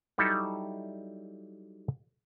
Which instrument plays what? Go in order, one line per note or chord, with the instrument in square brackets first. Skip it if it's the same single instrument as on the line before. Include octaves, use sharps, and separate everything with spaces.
[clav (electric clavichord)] F#3 G3 D#4 E4 A4